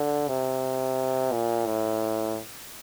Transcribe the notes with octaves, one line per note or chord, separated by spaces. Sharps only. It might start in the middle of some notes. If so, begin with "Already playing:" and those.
Already playing: D3
C3
A#2
A2